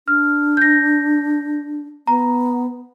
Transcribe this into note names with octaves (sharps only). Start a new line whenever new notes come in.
D4 F6
G6 A#6
B3 A#5